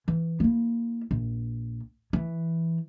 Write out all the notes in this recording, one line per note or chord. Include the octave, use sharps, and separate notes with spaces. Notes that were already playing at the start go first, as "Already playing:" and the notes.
E3
A#3 E4
A#1
E3